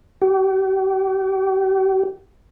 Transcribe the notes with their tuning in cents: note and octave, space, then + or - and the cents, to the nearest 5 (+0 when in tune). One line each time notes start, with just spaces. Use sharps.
G4 -40